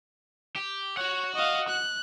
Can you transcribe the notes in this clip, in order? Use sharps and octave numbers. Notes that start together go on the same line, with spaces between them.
G4
F#4 C#5 F#5
D#5 F5
F#6